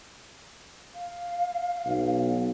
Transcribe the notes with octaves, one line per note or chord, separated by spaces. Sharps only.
F5
B1